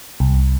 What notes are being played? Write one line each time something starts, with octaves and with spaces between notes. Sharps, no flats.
C2